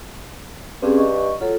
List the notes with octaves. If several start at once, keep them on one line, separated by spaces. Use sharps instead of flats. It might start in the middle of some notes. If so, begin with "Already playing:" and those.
G2 C4 C#4 G#4
D#5 C#6
F#3 F4 A4